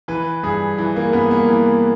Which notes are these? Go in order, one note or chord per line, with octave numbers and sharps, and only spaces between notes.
E3 B4
G2 G#4
E3
A#3
G2 B3
A#3
E3